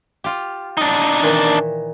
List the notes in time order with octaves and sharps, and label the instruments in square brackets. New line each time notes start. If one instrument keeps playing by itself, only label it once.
[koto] F4 G4
[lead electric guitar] D4 D#4
[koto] A#2 D#3 E3